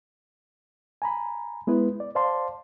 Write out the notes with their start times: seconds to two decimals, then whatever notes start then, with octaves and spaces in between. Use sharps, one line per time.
1.02 G#5 A#5 B5
1.67 G#3 B3 E4 B4
2.00 D5
2.15 C5 D5 F5 A5 C6